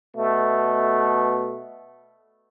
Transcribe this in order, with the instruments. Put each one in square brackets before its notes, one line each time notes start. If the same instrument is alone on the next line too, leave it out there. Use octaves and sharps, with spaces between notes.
[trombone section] B2 A3